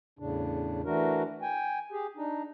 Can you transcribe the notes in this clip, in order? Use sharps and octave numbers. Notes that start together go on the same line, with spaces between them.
E2 A2 C#3 D4
E3 A3 D4 F#4 A#4
G5 G#5
G4 G#4
D4 D#4